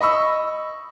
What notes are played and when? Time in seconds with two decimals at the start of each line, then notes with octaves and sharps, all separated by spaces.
0.01 D#5 B5 C#6 E6